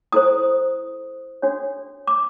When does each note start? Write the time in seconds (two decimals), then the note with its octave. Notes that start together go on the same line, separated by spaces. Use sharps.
0.12 E4 A4 C5 D#6
1.42 D4 F#4 A4 C#5
2.07 D6